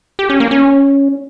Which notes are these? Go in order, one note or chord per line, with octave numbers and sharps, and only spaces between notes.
G4
C#4
A#3
C#4